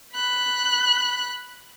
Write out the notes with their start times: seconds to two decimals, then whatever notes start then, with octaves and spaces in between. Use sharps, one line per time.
0.14 B5 F#6